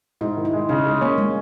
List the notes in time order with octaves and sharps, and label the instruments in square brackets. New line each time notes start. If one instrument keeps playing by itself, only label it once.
[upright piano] G#2 [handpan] E4
[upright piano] D#3
[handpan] E4
[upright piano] G#3
[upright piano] C#3 [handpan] D#4
[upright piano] G#3
[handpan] A#3 [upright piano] C#4
[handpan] G#3